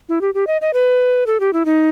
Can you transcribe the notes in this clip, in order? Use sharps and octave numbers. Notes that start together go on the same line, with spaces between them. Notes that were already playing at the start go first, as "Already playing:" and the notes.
E4
G4
G4
D#5
D#5
B4
A4
G4
E4
D#4